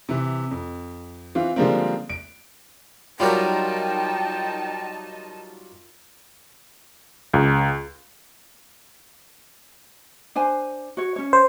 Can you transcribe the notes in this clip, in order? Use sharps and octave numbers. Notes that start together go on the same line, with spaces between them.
C3 E3
F2
E3 C4 F4
D3 F3 G3 G#3 A#3 C4
D7
F#3 G3 D#4 F4 A#4 G5 A5
C#2
D4 C5 G#5
F#4 C#5
C#4 C#5
C5